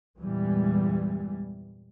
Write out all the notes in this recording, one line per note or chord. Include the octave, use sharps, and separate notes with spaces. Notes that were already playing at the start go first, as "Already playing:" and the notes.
E2 G2 A#2 E3 G3 G#3